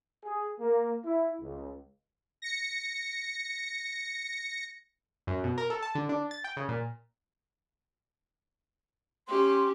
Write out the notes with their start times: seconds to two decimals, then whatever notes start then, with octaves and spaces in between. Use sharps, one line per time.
0.23 G#4
0.60 A#3
1.04 E4
1.41 C#2
2.42 A#6 C#7
5.27 F#2
5.44 B2
5.58 A#4
5.70 A4
5.82 A5
5.95 D3
6.09 D4
6.31 A6
6.44 G5
6.57 C#3
6.69 A#2
9.28 C#4 G4 C6